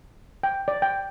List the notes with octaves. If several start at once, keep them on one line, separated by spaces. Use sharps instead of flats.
G5
D5
G5